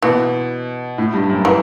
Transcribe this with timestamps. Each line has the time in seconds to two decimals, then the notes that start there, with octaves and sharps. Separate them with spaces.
0.02 B2 E3
0.98 A2
1.14 G2
1.29 F#2
1.45 E3